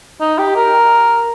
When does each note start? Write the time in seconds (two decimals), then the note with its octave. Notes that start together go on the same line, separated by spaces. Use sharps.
0.20 D#4
0.38 G4
0.56 A#4